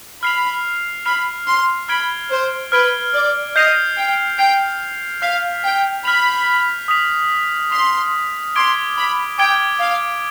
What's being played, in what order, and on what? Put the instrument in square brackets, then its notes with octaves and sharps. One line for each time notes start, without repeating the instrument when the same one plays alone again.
[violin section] B5 [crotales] F6 C7 F7
[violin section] B5 [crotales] F6 C7 F7
[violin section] C6
[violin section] B5 [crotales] F6 G#6 D7 G7
[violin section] C5
[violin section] B4 [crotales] F6 G#6 D7 G7
[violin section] D5
[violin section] D#5 [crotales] G6 C7 F7
[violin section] G5
[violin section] G5 [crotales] G6 C7 F7
[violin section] F5 [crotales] F6 B6 F7
[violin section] G5
[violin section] B5 [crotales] F6 B6 F7
[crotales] D#6 B6 F7
[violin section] C6 [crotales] D#6 B6 F7
[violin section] C6 [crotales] D6 G#6 D7 G7
[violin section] B5
[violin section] G5 [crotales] D6 G#6 D7 G7
[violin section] F5